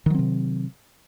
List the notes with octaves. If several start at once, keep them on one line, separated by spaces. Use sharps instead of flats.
C3 D#3 F#3 C4